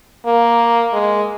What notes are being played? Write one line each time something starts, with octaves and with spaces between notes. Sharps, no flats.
A#3
G#3